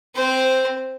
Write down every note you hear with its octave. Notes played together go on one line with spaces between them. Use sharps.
C4 C5